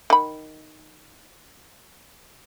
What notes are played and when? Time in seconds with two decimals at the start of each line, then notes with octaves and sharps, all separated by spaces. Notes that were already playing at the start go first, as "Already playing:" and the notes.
0.10 D#3 B5